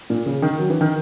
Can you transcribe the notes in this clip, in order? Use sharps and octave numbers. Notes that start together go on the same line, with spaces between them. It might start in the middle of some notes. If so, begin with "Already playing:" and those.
A#2
C#3
D#3
F#3
E3
D#3